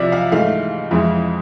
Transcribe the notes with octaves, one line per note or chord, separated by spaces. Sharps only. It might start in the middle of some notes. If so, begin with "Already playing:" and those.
Already playing: C2 C3 F3 D5 E5
F5
G#2 E3 A3 F5
F2 E3 G#3